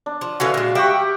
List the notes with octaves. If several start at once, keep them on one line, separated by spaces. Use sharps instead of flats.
D4
F3
D3 B3 C#4 F#4 E5 F5
A#2 G#3
G3 G4 E5 F#5 G5 C#6